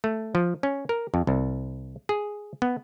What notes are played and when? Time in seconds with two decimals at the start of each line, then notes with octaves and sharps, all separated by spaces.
0.04 A3
0.35 F3
0.63 C#4
0.89 A#4
1.14 F2
1.27 C2
2.09 G#4
2.62 B3